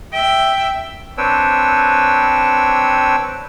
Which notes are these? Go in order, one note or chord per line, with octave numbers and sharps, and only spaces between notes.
E5 G5
C4 D4 B4 C#5 G5 E6